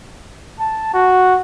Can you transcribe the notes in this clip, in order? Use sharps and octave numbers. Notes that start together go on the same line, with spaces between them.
A5
F#4